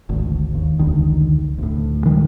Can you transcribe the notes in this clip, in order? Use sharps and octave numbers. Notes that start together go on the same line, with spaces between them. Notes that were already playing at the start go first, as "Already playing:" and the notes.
G#1 D2
D#2
F1 C#2 D3 D#3
D2 A2
D#3 F3 G3 G#3